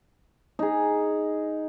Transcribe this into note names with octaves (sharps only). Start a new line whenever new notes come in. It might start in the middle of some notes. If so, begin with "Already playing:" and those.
D#4 G#4